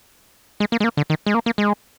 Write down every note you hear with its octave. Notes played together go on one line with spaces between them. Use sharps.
G#3
A#3
G#3
A#3
D3
D#3
G#3
A#3
A#3
G#3